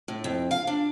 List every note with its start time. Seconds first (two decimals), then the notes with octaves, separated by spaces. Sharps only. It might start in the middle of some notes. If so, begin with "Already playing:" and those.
0.08 A2
0.24 F2
0.51 F5
0.67 D4